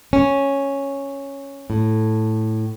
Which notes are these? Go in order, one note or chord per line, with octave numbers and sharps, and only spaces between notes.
C#4
A2